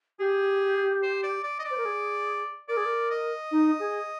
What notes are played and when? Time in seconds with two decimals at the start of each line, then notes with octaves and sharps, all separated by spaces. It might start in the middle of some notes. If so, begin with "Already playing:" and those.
0.19 G4 G#4
1.03 C5
1.23 D5
1.43 D5
1.59 D#5
1.65 D5
1.71 C5
1.78 A#4
1.85 G#4
2.68 A#4 D5
2.77 G#4
2.86 A#4
3.10 D#5
3.51 D#4
3.80 G#4